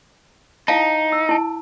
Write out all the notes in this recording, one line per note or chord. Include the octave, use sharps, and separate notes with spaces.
D#4 E4 F5 A5
E6
E4 A5